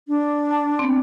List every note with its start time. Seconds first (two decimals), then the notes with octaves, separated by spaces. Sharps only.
0.08 D4
0.51 A5
0.79 B3 C4